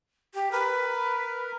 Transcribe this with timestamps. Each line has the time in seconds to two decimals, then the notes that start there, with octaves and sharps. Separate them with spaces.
0.34 G4
0.52 A#4 B4